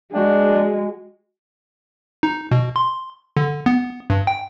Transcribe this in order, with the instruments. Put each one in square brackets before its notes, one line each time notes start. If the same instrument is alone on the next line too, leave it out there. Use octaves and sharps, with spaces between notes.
[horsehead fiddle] G#3 [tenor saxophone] D4 [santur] F#4 F#5 G5
[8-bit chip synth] D#4
B2
C6
D3
B3
G2
G5